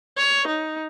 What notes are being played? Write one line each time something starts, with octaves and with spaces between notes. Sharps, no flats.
C#5
D#4